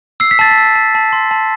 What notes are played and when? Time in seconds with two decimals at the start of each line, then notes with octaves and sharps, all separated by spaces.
0.20 E6 C7
0.31 B6
0.39 A5 A6
0.51 B6
0.57 E6
0.76 A5
0.95 A5
1.13 C6
1.31 A5